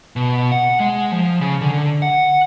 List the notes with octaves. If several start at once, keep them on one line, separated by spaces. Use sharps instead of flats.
B2
F#5
G#3
F3
C#3
D3
F#5